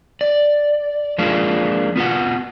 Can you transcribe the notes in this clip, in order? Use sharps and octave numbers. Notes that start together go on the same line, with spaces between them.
D5
F3 G#3 A#3 D4 F4
B3 F4 F#4 F#5